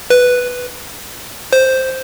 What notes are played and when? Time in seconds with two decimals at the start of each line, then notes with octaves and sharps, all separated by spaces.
0.10 B4
1.53 C5